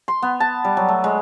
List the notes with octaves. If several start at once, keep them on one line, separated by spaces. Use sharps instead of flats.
C6
B3
A5
G3
F#3
A3
G#3